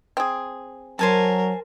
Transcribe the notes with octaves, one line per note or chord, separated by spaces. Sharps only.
C4 G#4
F#3 A#4 C5 G#5 A5